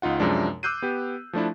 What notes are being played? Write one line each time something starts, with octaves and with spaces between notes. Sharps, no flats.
C#2 D#4 F4 F#5
F#2 C3 F3 G#3 D4
D6 E6 F#6 G6 C7 D#7
B3 G4
F3 A3 D4 E4